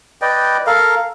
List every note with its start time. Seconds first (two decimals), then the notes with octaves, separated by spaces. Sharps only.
0.22 B4 D5 D#5 G5
0.67 A4 A#4 F5